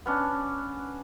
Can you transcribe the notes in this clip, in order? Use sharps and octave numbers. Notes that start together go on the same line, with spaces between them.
B3 C#4 D4